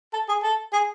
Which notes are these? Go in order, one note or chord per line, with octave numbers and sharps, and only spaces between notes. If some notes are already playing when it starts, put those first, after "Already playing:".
A4
G#4
A4
G#4